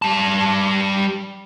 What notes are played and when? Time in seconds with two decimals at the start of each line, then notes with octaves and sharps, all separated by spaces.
0.02 G3 A5